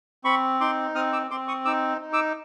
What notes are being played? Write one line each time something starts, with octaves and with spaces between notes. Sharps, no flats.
C4 B5 C#6
D#4 C6 D6
C4 D#6 F6
D6 E6
C4 C6 D6
C#6 D#6
D#4 D6 E6
D#4
D6 E6